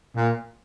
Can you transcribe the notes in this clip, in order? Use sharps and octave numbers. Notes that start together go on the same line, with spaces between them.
A#2